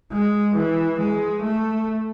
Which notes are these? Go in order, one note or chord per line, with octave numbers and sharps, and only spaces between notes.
G#3
E3
G#3
A3